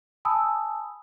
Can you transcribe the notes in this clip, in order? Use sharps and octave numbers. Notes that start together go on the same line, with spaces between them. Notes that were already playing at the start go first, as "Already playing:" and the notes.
G#5 A5 B5 D#6 E6